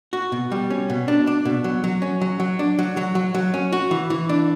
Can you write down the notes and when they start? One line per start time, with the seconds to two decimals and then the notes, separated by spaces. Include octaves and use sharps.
0.13 F#4
0.32 B2
0.52 G3
0.70 C#4
0.90 B2
1.08 D4
1.27 D4
1.45 B2
1.64 F#3
1.84 F#3
2.02 C#4
2.21 F#3
2.40 F#3
2.59 D4
2.79 F#3
2.97 F#3
3.15 F#3
3.35 F#3
3.54 C#4
3.73 F#4
3.91 E3
4.10 E3
4.29 D4